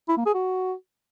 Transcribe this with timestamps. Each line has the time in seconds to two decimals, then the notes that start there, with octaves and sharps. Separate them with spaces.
0.09 E4
0.17 A#3
0.26 G#4
0.34 F#4